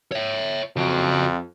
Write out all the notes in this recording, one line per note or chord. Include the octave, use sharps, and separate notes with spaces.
C#5 E5
F2 C#3 F#4